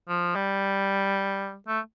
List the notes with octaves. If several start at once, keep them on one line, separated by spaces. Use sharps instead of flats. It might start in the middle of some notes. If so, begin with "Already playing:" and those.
F3
G3
A3